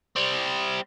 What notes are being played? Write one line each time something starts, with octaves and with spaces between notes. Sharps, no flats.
G3 C4